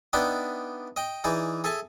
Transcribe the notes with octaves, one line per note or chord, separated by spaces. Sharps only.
B3 D4 D#4 D5 E5 G5
D#5 G5
E3 D#4 G#4 D5
G#4 A4 E5 G#5 A5